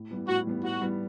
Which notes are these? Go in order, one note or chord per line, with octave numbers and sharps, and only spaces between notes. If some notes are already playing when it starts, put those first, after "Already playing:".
Already playing: A2
E3 G3 B3
A2 F#4
E3 G3 B3
A2 F#4
E3 G3 B3